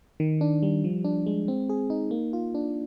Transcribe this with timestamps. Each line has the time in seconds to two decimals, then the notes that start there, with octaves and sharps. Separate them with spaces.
0.20 D#3
0.41 D4
0.63 G3
0.84 F3
1.04 D4
1.26 G#3
1.48 C4
1.69 G#4
1.90 D#4
2.11 A#3
2.33 F4
2.55 D4